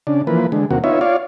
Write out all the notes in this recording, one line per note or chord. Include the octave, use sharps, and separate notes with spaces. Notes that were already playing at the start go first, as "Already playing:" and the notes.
C#3 D4
E3 F3 A#3 B4
D3 G#3
D#2 C3 A#3 F#4
B3 D#4 F4 C#5 E5
F4 C#5 D5 F5